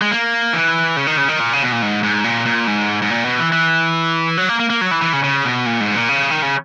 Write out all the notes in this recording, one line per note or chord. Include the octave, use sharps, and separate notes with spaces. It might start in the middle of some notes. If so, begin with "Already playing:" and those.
G#3
A#3
E3
C#3
D#3
C#3
D#3
A#2
C#3
B2
A#2
G#2
G#2
A#2
A#2
G#2
G#2
A#2
B2
E3
E3
F#3
A#3
A#3
A#3
F#3
E3
E3
C#3
C#3
B2
A#2
G#2
A#2
C#3
D#3
C#3